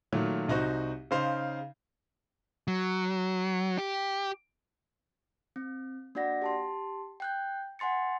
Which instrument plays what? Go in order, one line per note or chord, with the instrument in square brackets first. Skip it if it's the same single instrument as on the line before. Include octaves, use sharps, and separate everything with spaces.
[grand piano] A#2 D#3 F#3 A3
C2 D#4 F#4 C5 C#6
C#3 D#4 C5 F5 C6
[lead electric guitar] F#3
G4
[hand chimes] C4
A#3 D4 F#4 D5 F#5 A#6
G4 A5 C6
G5 F#6 G6
F#5 G#5 C6 A6 C#7